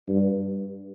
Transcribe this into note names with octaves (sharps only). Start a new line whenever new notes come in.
G2